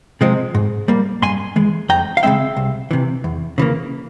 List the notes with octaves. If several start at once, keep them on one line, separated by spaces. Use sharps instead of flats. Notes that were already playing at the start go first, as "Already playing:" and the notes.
C3 F3 G#3 C4
G#2
G3 A#3
G2 G#5 C6
E3 G#3
F2 G5 A#5
F5
C#3 E3 G#3 C4 E5 G5
C2
C3 E3
E2
C#3 E3 A#3